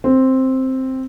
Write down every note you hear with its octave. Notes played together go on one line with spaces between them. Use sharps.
C4